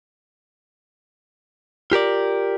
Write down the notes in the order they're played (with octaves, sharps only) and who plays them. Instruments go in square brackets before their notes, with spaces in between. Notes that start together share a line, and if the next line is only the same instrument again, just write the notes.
[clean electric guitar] F4 G4 A#4 D5